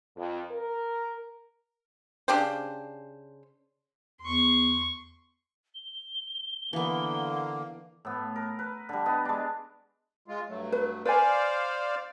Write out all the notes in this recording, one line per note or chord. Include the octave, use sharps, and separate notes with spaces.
F2
A#4
C#3 D4 G4 C5
E2 C6 C#6
G7
D3 E3 A#3 B3
A2 B3
A#4
B4
D3 G3
B3 D#5
G#3 D4
G#3 F4
G2 F#3 A3
B4
B4 C5 D5 F5 G#5